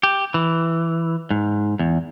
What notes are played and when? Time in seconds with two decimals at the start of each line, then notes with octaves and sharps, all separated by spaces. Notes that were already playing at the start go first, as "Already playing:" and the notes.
0.03 G4
0.34 E3
1.31 G#2
1.79 E2